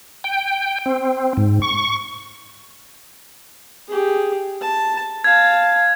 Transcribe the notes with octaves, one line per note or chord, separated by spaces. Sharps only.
G5
C4
G#2
C#6
G4 G#4
A5
F5 A5 G#6